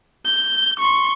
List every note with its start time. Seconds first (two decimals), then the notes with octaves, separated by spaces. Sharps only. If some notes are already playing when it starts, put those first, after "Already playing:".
0.25 G6
0.80 C6 C#6